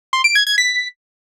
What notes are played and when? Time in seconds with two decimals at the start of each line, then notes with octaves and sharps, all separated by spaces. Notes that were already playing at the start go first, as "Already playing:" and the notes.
0.13 C6
0.24 D7
0.35 G#6
0.47 G#6
0.58 B6